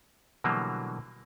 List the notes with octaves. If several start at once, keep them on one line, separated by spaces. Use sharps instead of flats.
B2 D3 E3 F#3 G3 A#3